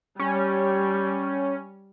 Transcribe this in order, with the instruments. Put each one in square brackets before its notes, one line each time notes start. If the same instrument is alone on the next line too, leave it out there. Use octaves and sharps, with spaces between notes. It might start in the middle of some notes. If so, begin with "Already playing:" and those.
[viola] G3 G4 [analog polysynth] C#4